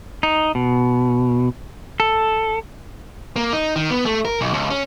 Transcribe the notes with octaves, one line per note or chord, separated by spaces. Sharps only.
D#4
B2
A4
A#3
D#4
D#3
B3
A3
A#4
B1
C#2
C#4